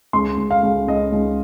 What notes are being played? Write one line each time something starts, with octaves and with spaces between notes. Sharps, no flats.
C#2 C6
C#2
F5
C#2
C#2 D#5
C#2